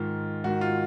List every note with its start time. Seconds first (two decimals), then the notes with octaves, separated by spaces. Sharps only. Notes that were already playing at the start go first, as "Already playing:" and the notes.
Already playing: G#2 D#3 F4
0.44 G#2 D#3 F#4
0.61 F4